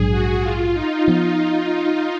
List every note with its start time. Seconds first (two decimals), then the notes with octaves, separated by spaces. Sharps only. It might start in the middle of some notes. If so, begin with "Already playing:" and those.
Already playing: A#1 G#2 F#3 D4 G#4
0.11 F#4
0.42 F4
0.74 D#4
1.08 F3 B3